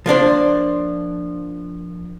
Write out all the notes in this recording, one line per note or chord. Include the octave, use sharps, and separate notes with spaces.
F3 A#3 D4 C5